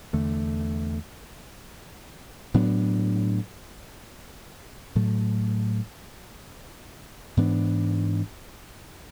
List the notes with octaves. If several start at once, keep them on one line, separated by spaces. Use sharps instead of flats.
E2 D3 A3
A2 F#3 B3 D4
A2 F#3 A3
G#2 E3 B3 D4